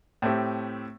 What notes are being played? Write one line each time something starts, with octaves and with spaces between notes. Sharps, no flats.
A2 A3 C4 G4